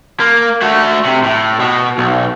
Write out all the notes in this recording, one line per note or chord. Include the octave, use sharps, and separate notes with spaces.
A#3
A3 F#4
C3
A2
B2
B1